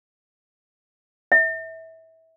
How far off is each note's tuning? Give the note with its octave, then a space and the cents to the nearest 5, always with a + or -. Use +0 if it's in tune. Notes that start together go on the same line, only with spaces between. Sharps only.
E5 -25